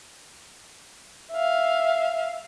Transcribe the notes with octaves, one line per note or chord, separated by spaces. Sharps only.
E5 F5